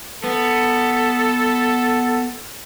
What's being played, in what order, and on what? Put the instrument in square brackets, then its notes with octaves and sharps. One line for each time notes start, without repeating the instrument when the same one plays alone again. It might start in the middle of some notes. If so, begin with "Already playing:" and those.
[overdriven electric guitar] B3 [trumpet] A4